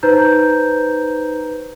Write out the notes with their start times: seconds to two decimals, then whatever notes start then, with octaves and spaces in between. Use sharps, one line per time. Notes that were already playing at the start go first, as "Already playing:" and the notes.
0.03 D#4 B4 C5 A#5 G6